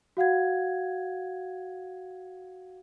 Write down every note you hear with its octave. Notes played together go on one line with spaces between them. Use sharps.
F#4 F5 F#5 G#6